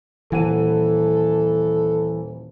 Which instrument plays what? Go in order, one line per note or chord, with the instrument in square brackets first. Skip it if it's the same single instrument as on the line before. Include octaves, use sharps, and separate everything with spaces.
[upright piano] D#1 F#5 D#7 [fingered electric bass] E3 [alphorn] A4